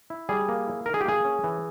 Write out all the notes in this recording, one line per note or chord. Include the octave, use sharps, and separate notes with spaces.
E4
G3 G#4
A#3
E4
D#3 A#4
G#4
G4
A#3 G#4
C#4
E3